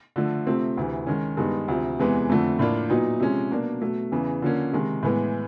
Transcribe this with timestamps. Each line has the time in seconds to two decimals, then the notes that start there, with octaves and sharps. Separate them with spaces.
0.16 D3 F3 A3
0.47 C3 F3 A3 C4
0.77 D2 C3 E3
1.07 D#3 G#3 C#4
1.37 G2 D#3 G#3 B3 D#4
1.68 D2 C3 F3
1.99 E2 C3 E3 G#3 B3
2.29 F2 D3 F3 A3
2.59 A2 F3 A#3 D4 F4
2.90 A#2 F#3 B3 D#4
3.20 C3 F3 G#3 C#4
3.51 B2 F#3 A#3 D4
3.82 B2 F#3 A3
4.12 E2 C#3 E3
4.42 D3 F3 A#3 C#4
4.73 C3 D#3 G#3
5.03 A2 E3 G#3 B3